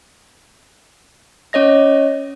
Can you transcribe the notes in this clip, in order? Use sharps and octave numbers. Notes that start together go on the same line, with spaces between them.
C#4 C#5 D#5 A#6